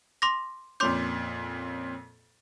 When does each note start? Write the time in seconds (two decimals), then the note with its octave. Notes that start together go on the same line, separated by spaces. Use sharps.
0.22 C6 D6 A#6
0.80 F2 A#2 C#4 C6 D6 G6